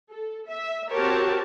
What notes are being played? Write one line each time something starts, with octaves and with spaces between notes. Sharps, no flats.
A4
E5
C4 F#4 G4 A#4 C#5 A5